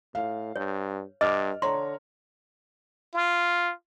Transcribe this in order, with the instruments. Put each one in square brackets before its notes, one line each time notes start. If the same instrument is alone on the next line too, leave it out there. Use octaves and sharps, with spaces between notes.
[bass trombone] A2 [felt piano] F5
[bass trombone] G2 [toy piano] C#5
[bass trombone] G2 [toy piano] D#5 [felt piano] D6 F6
[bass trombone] D3 [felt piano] C#5 A#5 [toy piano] C6
[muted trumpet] F4